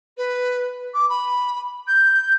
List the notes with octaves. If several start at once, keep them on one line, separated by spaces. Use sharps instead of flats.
B4
D6
B5
G6